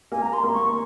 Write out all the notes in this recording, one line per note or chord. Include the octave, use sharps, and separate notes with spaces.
A#3 G#5
A#5
C6
A#3
C#6